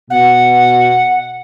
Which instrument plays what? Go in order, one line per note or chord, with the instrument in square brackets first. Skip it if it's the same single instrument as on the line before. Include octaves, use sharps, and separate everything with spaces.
[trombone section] B2 [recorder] F#5